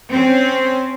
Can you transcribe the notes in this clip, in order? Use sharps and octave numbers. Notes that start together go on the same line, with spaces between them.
C4 C#4